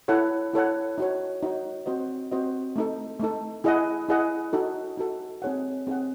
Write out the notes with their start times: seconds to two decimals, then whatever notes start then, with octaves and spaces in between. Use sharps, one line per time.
0.08 E4 A4 C#5 F#5
0.54 E4 A4 C#5 F#5
0.98 D#4 F#4 C#5
1.42 D#4 F#4 C#5
1.86 C4 F#4 C5 D#5
2.31 C4 F#4 C5 D#5
2.76 A3 D#4 A4
3.20 A3 D#4 A4
3.64 E4 G#4 D#5 F#5
4.09 E4 G#4 D#5 F#5
4.53 D#4 F#4 A4
4.98 D#4 F#4 A4
5.42 C4 D#4 G#4 C#5 F#5
5.87 C4 D#4 G#4 C#5 F#5